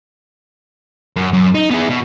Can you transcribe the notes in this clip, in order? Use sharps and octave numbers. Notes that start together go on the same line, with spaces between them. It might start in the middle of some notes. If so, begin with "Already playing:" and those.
F#2
F#2
D#4
B3 G#4
B2